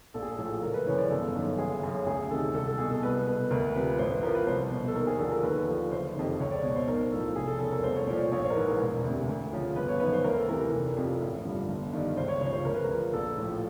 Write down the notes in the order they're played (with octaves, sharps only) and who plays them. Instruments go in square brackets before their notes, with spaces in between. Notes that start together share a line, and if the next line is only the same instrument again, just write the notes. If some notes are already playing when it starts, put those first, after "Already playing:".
[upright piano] A#1 A4
G#4
A4
A2 F3
F#1 A#4
B4
F#2 C#3 E3 C#5
D5
G1 A4
F#2 D#3
F#1 G#4
F#2 C#3
D2 G#4
C3 D#3 A4
C2 A4
A4
B2 G#4
A4
C2 B4
B2 B4
D2 A#4
C3 F3 B4
A1 C5
B4
A2 F3 A#4
B4
C2 C5
B2
A4
D#2 A#4
G#4
D3 F3 A4
A#4
D#2 B4
D3 F3
F#1 C5
F2 C3 D#3
C#2 C#5
D5
B2 C#5
C5
B1 A#4
A2 F3 A4
F1 G#4
A4
E2 C#3 A4
A#4
C2 C5
C#5
A#2 F3 D5
C#5
A#1 C#5
C5
A#4
G#2 E3 B4
A#4
E1
D2 C3
D2
C#3 F3
G1 B4
C#5
F#2 D#3 B4
C5
D2 A#4
A4
C3 E3 A#4
A#4
F1
F2 C3 F3
A1
G2 D3 F3
G1
G2 D#3
C#2 C5
C#5
C#3 F3 C#5
C5
D2 A#4
B4
C#3 A#4
F3
A#1 A4
A2
F3